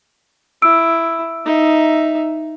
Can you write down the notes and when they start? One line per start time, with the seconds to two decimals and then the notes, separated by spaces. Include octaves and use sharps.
0.62 E4 E6 D7
1.45 D#4 E5